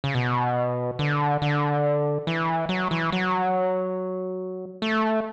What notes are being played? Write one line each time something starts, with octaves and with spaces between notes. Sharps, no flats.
C#3
B2
D3
D3
E3
F#3
E3
F#3
A3